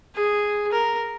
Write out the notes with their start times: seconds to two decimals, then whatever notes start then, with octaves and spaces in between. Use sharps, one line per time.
0.15 G#4
0.72 A#4